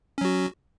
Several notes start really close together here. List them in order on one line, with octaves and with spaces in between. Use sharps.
C#4 F#3 F#4